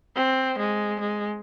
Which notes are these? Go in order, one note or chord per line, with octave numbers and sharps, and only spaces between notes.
C4
G#3
G#3